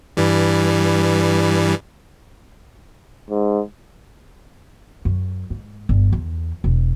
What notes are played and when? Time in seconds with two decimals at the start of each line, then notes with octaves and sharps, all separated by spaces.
0.17 G2 E3 G3
3.30 G#2
5.05 F#2
5.50 G#2
5.89 G1
6.13 E2
6.64 E1